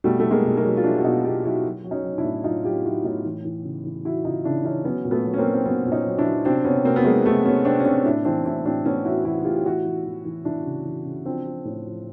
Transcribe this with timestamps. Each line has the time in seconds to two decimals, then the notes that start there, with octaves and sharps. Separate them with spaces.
0.04 B2 G3 A3
0.20 F#3 A3
0.31 G#3 A#3
0.45 B2
0.57 G#3 A#3
0.64 F#3
0.77 F4
0.84 F#3 D4 E4
0.98 F#4
1.04 B2 D#4 F4
1.24 B2 F4 G4
1.44 F#3 E4 F#4
1.64 F#3
1.84 F#3
1.91 C#4 D#4
2.04 F#3
2.18 D4 E4
2.24 A2
2.44 F#3 D#4 F4
2.64 F#3 F4 G4
2.84 F#3 E4 F#4
3.04 A2 D#4 F4
3.25 E3
3.45 E3
3.64 C#3
3.85 E3
4.05 E3 E4 F#4
4.25 C#3 D#4 F4
4.44 C#3 D4 E4
4.65 E3 C#4 D#4
4.85 F#3 B3 C#4
5.05 A#2
5.11 A3 B3
5.25 F#3
5.34 C#4
5.38 A#3 C4
5.44 F#3
5.54 C4
5.65 F#3 B3 C#4
5.85 A#2
5.92 C#4 D#4
6.04 F#3
6.18 D4 E4
6.25 F#3
6.45 C3 C4 D4
6.65 C3 B3 C#4
6.85 C3 A#3 C4
6.96 B3
7.05 F#3 G#3 A#3
7.25 C3 A3 B3
7.45 C3 B3 C#4
7.65 C3 C4 D4
7.80 C#4
7.85 C3 C4 D4
8.05 A2 D4 E4
8.25 E3 C4 D4
8.45 A2 D4 E4
8.65 A2 C4 D4
8.85 A2 B3 C#4
9.05 E3 E4 F#4
9.25 E3 E4 F#4
9.41 F#4
9.45 A2 F4 G4
9.56 G4
9.65 E3 E4 F#4
9.86 E3
10.06 E3
10.25 E3
10.45 E3 D4 E4
10.65 C#3
10.86 E3
11.05 C#3
11.25 F3 C4 D4
11.45 F3
11.65 A2
11.86 F3